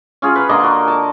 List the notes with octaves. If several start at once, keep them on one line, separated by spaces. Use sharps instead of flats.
C#4 F4 F#4 G#4
B4 B5 C6
D3 A#3 D#5 A5
F#4 A#4
A5